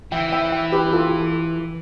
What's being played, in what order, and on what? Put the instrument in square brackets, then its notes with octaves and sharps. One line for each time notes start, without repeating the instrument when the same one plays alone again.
[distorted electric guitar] E3 [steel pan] E5 G5
[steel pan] E5 G5
E5 G5
G4 B4
F4 A4